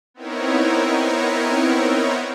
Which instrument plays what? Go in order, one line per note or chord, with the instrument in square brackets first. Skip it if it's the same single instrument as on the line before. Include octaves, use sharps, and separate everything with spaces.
[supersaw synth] B3 C4 D#4 E4 A#4 C#5